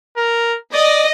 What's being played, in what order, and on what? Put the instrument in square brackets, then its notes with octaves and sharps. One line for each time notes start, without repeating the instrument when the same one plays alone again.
[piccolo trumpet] A#4
[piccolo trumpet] D5 [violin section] D#5